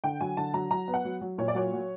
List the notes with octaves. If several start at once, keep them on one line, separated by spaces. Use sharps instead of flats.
D3 G5
F#3 G#5
D3 A5
F#3 A#5
F#3 A#5
B3
F#5
F#3
F#3
A#2 C#5
D5
F#3 C#5
F#3